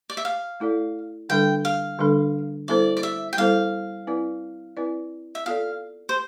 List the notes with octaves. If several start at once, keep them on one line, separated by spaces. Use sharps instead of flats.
D5
E5
F5
A3 E4 A4 D5
D3 G3 D4 A4 G5
F5
D3 G3 D4 A4
G3 B3 E4 A4 C5 D5
D5
E5
G5
G3 B3 E4 A4 C5 F5
C4 E4 B4 D5
C4 E4 B4 D5
E5
B3 F4 A4 D5 F5
C5